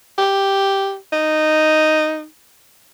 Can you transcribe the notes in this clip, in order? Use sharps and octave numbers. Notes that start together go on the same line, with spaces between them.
G4
D#4